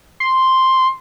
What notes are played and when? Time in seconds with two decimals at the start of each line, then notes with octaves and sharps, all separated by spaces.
0.20 C6